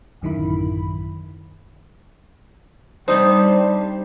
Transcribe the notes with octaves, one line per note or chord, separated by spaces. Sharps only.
A1 F#2 D3 D#3 E4 B5
C3 G3 D4 D#4 C5